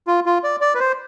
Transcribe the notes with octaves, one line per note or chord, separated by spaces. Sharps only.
F4
F4
D5
D5
B4
C5